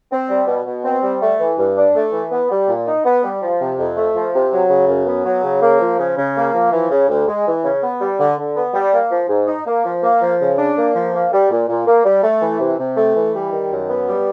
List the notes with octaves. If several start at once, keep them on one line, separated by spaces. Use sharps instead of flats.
C4
G3
B2
B2
C4
G3
A3
E3
G2
D4
A3
E3
B3
G3
A#2
D#4
B3
G3
F3
C3
F2
A3
F3
C3
F#3
C#3
F#2
B3
F#3
C#3
A#3
F3
C#3
C#3
A#3
F3
E3
C#3
D2
G#3
E3
C#3
B3
G3
D3
D3
B3
G3
A#3
F3
G#2
D#4
A#3
F3
A#3
F3
C#3
D4
A#3
F3
A#3
G3
A#2
A#2
A#3
G3
A3
E3
C3
C3
A3
E3
G3
D#3
F#2
B3
G3